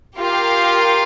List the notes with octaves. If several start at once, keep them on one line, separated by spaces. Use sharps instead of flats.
F4 G4 A#4 F5